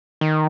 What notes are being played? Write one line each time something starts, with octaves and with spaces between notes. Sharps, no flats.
D#3